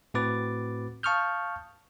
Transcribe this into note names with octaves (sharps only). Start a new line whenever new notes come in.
A2 C4 F#4 B4 D6 A6
F5 A5 C#6 D#6 F6 G6